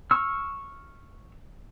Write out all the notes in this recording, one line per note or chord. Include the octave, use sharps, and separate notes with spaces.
C#6 E6 F6